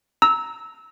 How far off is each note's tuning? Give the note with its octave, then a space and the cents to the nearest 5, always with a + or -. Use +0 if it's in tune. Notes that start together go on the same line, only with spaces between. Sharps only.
A#5 +0 E6 -20